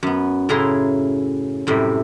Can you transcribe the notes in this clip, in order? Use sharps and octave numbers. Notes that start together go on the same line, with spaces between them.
F#2 B3
A2 C#3 E4 G#4 A#5 C6
F#2 A2 C3 G3